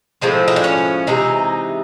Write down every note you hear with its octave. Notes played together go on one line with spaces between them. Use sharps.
A2 F3 G#3 C4
D#4
D4
C#4
C3 E3 G#3 D#4